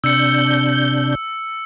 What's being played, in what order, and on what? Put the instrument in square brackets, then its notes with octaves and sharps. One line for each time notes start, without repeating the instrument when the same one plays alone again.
[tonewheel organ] C3 D4 G6 [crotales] E6 C#7